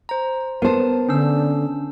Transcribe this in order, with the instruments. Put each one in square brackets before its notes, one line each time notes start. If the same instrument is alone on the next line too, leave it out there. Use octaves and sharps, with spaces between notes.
[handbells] C5 A#5
[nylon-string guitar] B3 C5 [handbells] A#4 A5
[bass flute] D3 [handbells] C#4 D4 E6